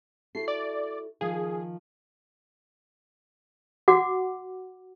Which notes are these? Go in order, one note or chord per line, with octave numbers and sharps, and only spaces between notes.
E4 F#4 A4 C7
D5
D#3 F3 G#4 F5
F#4 F#5 D6